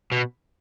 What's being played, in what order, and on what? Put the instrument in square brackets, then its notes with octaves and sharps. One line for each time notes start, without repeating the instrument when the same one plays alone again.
[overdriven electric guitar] B2